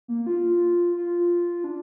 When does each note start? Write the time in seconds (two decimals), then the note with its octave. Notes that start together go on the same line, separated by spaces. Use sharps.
0.08 A#3
0.27 F4
0.96 F4
1.64 D4